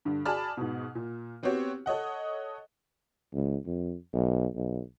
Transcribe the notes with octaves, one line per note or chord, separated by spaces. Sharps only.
G2 D3
F#4 G#4 D5 A5 B5 F6
G#2 B2
A#2
B3 C4 F#4 G4 C#5
A4 C#5 D#5 F#5
C#2
F2
B1
B1